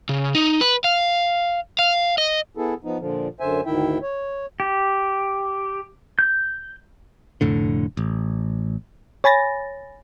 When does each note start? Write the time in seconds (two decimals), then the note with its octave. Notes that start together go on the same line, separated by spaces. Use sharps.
0.09 C#3
0.35 D#4
0.61 B4
0.84 F5
1.79 F5
2.18 D#5
2.57 B3 E4 G#4 A4
2.84 F3 B3 D#4
3.00 A#2 D3 F3
3.40 F#2 D3 C5 E5 G#5
3.66 D2 G#2 D#3 E4 E5 G5
4.02 C#5
4.60 G4
6.19 G6
7.41 F1 A2 D3
7.97 A1
9.24 C#5 G#5 B5 A6 A#6